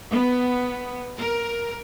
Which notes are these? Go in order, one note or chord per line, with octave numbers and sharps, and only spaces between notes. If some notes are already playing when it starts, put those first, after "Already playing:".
B3
A#4